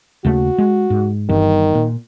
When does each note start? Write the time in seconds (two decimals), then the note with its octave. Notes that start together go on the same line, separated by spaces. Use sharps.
0.25 D#2 C#3 A3 F#4
0.58 G#3
0.90 G#2
1.29 G1 G2 D#3 E3
1.75 A#2